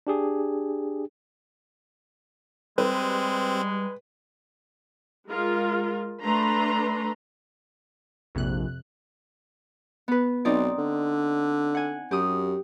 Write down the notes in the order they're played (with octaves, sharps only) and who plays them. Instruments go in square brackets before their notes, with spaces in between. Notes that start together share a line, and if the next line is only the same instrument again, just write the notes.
[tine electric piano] D4 G4 G#4
[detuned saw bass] G3 [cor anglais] G#3 [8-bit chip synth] C4 [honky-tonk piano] B4
[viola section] G#3 F4 A#4
A3 D4 B4 A#5 C6
[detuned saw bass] A#1 [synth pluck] F2 C3 F#6
[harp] B3 B4
[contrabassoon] B1 [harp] C4 D#4 D5
[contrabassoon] D3
[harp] F#5 G#5
[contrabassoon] F#2 [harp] G4 D#6